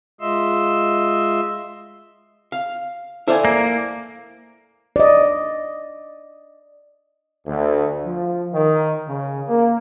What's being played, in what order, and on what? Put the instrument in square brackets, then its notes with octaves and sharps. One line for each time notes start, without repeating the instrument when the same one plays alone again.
[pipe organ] G#3 F4 D#5 E5 C6 E6
[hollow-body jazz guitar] F5
[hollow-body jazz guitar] E4 C5 F5 [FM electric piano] A4 D5 G#5
[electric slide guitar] A#3
[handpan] D5 D#5
[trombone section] D2
F3
D#3
C#3
A#3